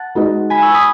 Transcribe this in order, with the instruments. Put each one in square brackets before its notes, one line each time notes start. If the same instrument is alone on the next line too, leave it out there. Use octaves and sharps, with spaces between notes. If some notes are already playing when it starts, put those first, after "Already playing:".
Already playing: [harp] F#5 A5
[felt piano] G#3 D#4 F#4 B4 D#5
[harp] G#5 B5
C#6 E6
B5 D#6